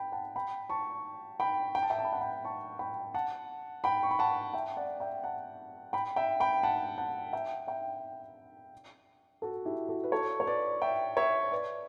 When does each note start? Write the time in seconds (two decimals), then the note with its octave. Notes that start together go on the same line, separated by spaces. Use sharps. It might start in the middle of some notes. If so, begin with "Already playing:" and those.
Already playing: G5 B5
0.12 F#5 A5
0.36 G5 B5
0.70 A5 C#6
1.40 G5 B5
1.75 G5
1.83 A5
1.90 E5 G5
1.99 A5
2.05 B5
2.12 F#5 A5
2.21 G5 B5
2.45 A5 C#6
2.79 G5 B5
3.14 F#5 A5
3.84 G5 B5
4.03 C#6
4.11 B5
4.19 F#5 A5
4.54 E5 G5
4.77 D5 F#5
5.00 E5 G5
5.24 F#5 A5
5.93 G5 B5
6.16 E5 G5
6.40 G5 B5
6.63 F#5 A5
6.98 F#5 A5
7.33 E5 G5
7.67 E5 G5
9.42 F#4 A4
9.65 E4 G4
9.89 F#4 A4
10.04 B4
10.12 A4 C#5
10.40 C#5
10.47 B4 D5
10.82 E5 G5
11.17 C#5 E5
11.51 B4 D5